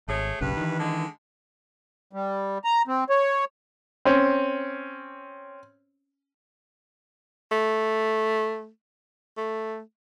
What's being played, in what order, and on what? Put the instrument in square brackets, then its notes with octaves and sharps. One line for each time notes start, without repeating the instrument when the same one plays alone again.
[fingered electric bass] G#1 [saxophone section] A3 G#4 C#5
[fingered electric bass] F#1 B1 C#3 [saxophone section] G2 B4
[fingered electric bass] D#3 E3
[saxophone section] D3 G#3
[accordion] G3
A#5
C4
C#5
[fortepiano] C4 C#4
[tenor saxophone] A3
A3